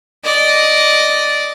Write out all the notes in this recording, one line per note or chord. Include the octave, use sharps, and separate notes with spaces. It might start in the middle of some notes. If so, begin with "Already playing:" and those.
D5 D#5